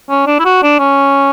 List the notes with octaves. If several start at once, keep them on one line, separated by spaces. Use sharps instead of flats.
C#4
D4
E4
F#4
D4
C#4